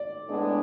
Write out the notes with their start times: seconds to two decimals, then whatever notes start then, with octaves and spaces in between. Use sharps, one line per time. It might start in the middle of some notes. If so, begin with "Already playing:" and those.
Already playing: D5
0.26 A2 G#3 B3 D4 G#4